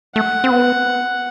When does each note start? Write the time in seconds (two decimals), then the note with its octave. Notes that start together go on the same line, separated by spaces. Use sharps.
0.16 A3 F#5
0.44 C4
0.51 B3